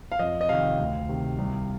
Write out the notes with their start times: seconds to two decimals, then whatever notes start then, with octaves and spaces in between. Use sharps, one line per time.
0.12 F5
0.19 F2 D#5
0.41 D#5
0.49 C3 D#3 F5
0.79 D2
1.09 C3 D#3
1.38 C2